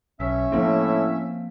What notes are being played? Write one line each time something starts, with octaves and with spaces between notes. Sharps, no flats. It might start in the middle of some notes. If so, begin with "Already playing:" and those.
B1 C#4 E5
A2 F3 A#3 C4